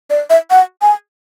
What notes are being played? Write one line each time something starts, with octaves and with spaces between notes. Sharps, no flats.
D5
E5
F#5
G#5